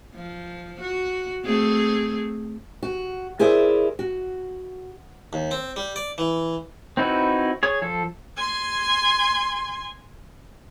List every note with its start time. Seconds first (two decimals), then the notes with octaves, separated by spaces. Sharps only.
0.15 F3
0.80 F#4
1.45 A3 C4 G#4
2.83 F#4
3.39 E4 G#4 A#4 C5 D5 E5
3.99 F#4
5.33 D#2
5.51 C4
5.76 G3
5.96 D5
6.18 E3
6.97 C4 D#4 E4 F#4 B4
7.63 G#4 C#5
7.82 F3 A4
8.37 G#5 C6